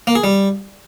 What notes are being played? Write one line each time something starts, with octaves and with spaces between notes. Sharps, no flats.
A#3
G#4
G3